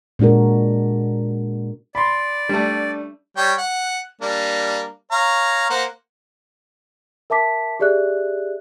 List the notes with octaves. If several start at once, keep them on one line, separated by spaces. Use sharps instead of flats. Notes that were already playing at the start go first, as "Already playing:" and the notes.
A#2 G#3 D4 F#4 A#4
D5 B5 C6
G3 A3 D4
G3 C#5 G5
F#5
G3 A#3 D4
C#5 F5 A#5
A#3 C5 F#5
A#4 E5 A5 D6 B6
G4 G#4 D5 E5 F#6